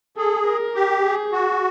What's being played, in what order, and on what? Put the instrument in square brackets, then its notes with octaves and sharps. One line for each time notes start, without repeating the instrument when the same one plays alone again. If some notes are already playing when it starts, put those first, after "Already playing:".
[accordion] G#4 [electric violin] A4
[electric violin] A#4
[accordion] G4
[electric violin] G#4
[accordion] F#4